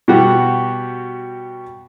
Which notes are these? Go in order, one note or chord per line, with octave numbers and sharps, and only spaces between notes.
B2 G3 F#4 G4